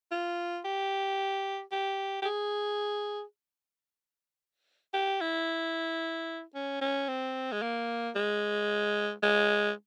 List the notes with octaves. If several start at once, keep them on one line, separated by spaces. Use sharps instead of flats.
F4
G4
G4
G4
G#4
G4
E4
C#4
C#4
C4
G#3
A#3
G#3
G#3